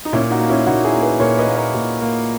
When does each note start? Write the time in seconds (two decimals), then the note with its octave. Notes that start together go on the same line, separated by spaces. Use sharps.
0.05 D#4
0.13 A#2 C#4 E4
0.30 D#4 F#4
0.40 A#3
0.49 C#4 E4
0.66 A#2 D#4 F#4
0.84 E4 G#4
0.93 A#3
1.02 G#4 B4
1.20 A#2 A#4 C#5
1.38 B4 D#5
1.47 A#3
1.56 A#4 C#5
1.75 A#2
2.01 A#3